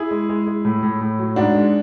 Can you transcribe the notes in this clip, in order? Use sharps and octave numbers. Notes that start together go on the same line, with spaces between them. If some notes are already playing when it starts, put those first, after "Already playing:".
Already playing: E4 G#4
G#3
G#3
G#3
A2
A2
A2
F#3
G#2 D4 F#4
G#3